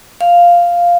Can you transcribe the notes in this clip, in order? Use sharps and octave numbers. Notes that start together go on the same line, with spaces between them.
F5